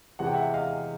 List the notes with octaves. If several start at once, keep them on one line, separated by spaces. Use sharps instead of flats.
E2 C3 E3 G#3 F#5
G5
E5 F#5
D#5 F5